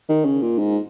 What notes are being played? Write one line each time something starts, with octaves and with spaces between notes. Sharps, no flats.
D#3
C#3
A#2
G#2